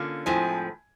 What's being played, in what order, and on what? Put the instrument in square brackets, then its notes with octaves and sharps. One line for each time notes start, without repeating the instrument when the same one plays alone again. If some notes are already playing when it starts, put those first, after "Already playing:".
Already playing: [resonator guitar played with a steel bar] D3 A#3 C#4 F4
[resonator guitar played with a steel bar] A2 F3 G#3 C4 [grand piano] G#5